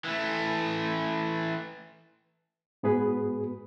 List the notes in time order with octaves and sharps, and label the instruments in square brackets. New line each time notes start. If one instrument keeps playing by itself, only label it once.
[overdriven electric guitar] E3 A3
[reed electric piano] G#2 B3 F#4 G#4 B4